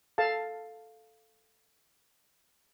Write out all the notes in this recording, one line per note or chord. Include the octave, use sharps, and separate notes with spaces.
A4 F5 A5